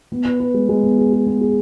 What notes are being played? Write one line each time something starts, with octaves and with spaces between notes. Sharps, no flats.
B3
B4
B4
G#3
G#3
B3
G#4
G#4
B3
G#4